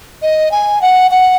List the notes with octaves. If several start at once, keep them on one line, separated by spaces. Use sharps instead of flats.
D#5
G#5
F#5
F#5